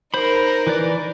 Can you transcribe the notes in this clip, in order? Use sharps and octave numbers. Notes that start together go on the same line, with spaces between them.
D#4 A#4 C5 B5
E3 B4 D5